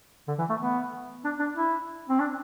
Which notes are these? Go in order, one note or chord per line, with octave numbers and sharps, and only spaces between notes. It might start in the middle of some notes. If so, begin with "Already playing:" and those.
D3
E3
A3
B3
D4
D4
E4
C4
D4